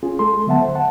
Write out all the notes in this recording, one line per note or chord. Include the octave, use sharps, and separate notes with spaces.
C#4 F4 G#4
G#3 A4 C6
D3 F#3 B3 E5 F#5 A5
C5
F#5 A5